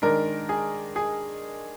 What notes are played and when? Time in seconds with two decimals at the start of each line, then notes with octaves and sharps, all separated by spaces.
0.02 D#3 G#3 D4 A#4
0.49 G#4
0.96 G#4